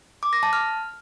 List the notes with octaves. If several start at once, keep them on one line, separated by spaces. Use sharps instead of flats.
D6
A#6
A5
F6